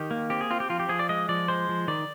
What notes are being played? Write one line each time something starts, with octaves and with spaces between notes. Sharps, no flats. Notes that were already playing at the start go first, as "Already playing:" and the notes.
Already playing: D#3 G4
A#3
C4 G4
G#4
C4 F4
G4
F3 F4
G4
F3 G#4
D5
G#3 D#5
F3 D5
G#3 C5
F3
D#3 D5